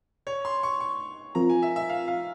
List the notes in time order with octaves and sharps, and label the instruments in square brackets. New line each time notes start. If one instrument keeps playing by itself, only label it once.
[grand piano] C#5
C6
C#6
C#6
[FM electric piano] F3 C4 F4 A#4 [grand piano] A#5
[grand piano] G#5
E5
E5
F5
F5